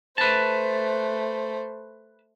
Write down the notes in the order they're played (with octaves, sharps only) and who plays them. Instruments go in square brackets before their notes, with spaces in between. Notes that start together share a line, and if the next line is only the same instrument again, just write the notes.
[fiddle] A3 C5 [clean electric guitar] B4 A5